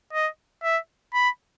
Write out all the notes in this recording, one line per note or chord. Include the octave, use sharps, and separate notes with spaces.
D#5
E5
B5